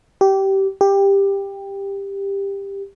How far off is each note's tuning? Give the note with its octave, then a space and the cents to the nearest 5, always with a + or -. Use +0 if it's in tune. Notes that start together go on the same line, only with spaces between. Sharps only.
G4 -20
G4 +15